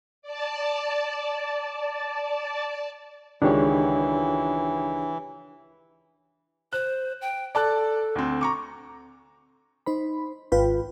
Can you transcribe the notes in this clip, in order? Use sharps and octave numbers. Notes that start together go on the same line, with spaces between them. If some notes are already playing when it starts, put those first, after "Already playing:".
D5 A5
C#2 D#3 E3 G#3 D4 G4 C#5
C5 F#6
G5
A4 D5 A5 F#6
D2 C4
A#5 C#6 D6
D#4 C5 B5
G#1 F4 B4 G5